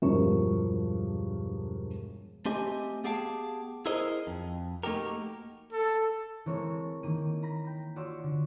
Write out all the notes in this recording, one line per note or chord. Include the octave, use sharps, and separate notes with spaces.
E1 G2 F3 F#4 A#4 C#6
A3 C4 G4 D#5 G#5
B3 G4 G#4 F5 G5 A5
E4 G#4 A#4 C5 D#5
F2
A3 A#3 D#4 F#4 G4 A#4
A4
E3 G#3 A3 C4 A#4 C#5
D#3 E3 A#3 D#7
A#5 B5 A#6
G5 B6
F4 F#4 C#5 D5 C6 E6
D3